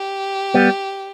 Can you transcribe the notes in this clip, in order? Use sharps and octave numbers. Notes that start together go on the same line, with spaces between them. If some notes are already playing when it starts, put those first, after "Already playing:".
Already playing: G4
G3 B3